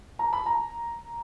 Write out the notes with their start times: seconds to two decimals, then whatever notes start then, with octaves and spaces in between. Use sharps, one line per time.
0.19 A#5
0.33 B5
0.46 A#5